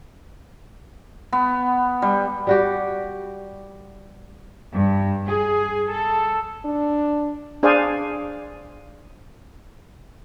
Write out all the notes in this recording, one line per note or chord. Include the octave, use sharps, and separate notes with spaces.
B3
G3
G3 F#4 G4
G2
G#4
A4
D4
D4 G#4 C5 D5 F5 G#5